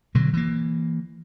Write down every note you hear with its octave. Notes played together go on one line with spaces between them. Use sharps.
B2 D3 F#3
E3 A#3